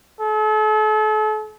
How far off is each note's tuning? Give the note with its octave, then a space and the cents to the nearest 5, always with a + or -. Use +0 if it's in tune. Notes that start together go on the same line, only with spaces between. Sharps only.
A4 -40